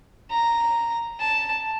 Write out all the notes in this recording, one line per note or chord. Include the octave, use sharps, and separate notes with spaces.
A#5
A5